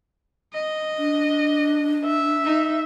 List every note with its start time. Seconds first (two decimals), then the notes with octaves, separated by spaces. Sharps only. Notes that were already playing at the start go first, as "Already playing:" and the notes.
0.54 D#5
0.98 D4
2.05 E5
2.45 D#4